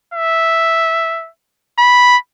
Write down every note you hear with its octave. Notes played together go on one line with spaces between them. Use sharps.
E5
B5